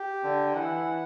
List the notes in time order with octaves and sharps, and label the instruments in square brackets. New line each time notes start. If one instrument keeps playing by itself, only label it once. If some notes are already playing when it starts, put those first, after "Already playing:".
Already playing: [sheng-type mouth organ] G4
[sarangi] D3
[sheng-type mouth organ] G5
[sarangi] E3 [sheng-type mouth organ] F#5